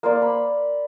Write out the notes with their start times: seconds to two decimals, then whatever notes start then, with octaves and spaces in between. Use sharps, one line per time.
0.03 A#3 C5 D5
0.22 B5